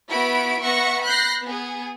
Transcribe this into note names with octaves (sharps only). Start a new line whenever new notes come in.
B3 E4 F#4 B5 D7
B3 E5 F#5 C#6 A#6 C#7
B5 F#6 G6 A#6 C7
B3 G#4